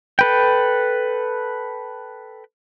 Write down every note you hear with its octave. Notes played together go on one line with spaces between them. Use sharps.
A4 B4 G5